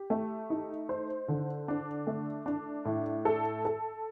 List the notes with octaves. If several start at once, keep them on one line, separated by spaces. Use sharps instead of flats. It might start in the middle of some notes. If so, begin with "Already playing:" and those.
Already playing: G4
A3
D#4
C5
D3
D4
A3
D4
A2
A4
A4